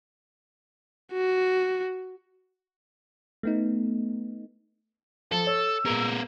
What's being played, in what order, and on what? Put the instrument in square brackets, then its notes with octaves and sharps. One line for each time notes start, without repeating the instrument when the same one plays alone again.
[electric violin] F#4
[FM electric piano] A3 B3 D#4
[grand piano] F3 [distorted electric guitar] A4 [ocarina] A5
[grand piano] C#5 [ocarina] E6
[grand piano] A#2 G#3 [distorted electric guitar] B3 A#4